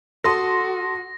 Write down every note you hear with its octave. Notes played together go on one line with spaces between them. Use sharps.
F#4 A4 C6 D#6 A#6